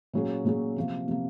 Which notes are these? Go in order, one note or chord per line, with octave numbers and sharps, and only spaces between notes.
A#2 F#3 C#4 G#4
A#2 F#3 C#4 G#4
C3 F3 A#3
C3 F3 A#3